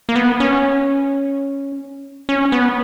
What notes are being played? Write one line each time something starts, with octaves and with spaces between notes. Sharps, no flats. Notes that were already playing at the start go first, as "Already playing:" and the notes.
A#3
B3
C#4
C#4
B3